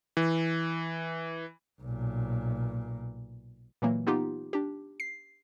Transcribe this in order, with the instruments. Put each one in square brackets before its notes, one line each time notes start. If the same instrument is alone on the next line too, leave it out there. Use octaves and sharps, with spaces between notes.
[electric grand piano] E3
[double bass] B1 A#2
[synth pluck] A#2 E3 F#3 A#3
B3 D#4 F4 G4
D4 G4
C7